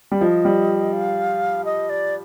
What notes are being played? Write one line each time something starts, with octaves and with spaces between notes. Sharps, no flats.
G3
F3 D#5
G3
F5
D#5
D5